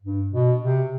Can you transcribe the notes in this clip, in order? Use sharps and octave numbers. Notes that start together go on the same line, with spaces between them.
G2
B2
C3